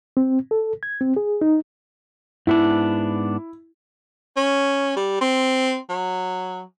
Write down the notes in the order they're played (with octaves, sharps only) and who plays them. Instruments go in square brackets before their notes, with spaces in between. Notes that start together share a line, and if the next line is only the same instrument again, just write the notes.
[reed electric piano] C4
A4
G#6
C4
G#4
D#4
[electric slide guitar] G#2 B3 D4 [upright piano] E4
[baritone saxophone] C#4
G3
C4
F#3